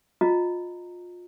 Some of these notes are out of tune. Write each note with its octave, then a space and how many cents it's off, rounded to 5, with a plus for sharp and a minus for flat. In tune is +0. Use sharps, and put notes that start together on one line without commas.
F4 +25 D#5 -5 A#5 -15